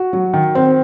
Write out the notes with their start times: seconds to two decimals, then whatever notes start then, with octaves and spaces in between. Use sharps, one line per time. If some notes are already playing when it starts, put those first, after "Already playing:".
Already playing: F#4
0.13 F#3
0.34 D#3
0.55 C4